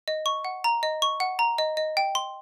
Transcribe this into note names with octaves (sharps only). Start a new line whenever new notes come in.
D#5
C#6
F#5
A#5
D#5
C#6
F#5
A#5
D#5
D#5
G5
C6